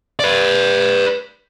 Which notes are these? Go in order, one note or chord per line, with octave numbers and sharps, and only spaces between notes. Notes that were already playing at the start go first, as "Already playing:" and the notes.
B4 D5